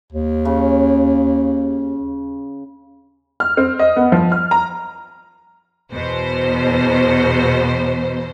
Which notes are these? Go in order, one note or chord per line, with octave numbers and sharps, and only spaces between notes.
D#2
C#3
F6
C4
D#5
B3
F3
F6
A#5
E2 B2 C5